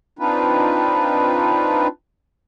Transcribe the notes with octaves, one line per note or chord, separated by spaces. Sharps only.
C4 D4 D#4 F4 B4